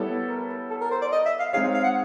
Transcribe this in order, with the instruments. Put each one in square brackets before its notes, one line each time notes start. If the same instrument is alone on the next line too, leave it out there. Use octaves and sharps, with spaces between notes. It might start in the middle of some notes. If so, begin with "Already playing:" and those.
Already playing: [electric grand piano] G3 B3 E4 A4 C#5
[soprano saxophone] A#4
A4
A#4
C5
D5
D#5
E5
F5
[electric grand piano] G#3 C4 D#4 G#4 C#5 [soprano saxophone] F5
[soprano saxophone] F5
F#5